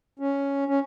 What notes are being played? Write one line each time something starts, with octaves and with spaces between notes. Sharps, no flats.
C#4
C#4